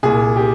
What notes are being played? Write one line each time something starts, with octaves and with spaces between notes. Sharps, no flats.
C2 A#2 G#4
G4